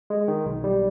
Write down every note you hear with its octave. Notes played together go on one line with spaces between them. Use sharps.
G#3
D#3
B1
G3